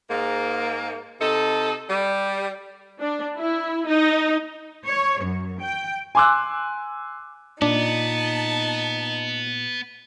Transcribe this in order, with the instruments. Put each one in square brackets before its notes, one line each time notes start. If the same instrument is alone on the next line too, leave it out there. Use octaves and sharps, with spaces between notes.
[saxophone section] G#2 A#3
C3 D#4 A4
G3
[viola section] D4
E4
D#4
[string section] C#5
F#2
G5
[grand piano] G#5 C6 D6 E6 F#6
[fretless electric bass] A#2 [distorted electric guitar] B3 [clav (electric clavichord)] D4 [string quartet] D#4 A5